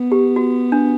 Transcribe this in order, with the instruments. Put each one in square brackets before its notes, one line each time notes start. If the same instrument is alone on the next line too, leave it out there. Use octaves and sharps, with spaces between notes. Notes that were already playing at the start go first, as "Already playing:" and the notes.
Already playing: [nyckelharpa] B3
[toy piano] G4
F#4
D4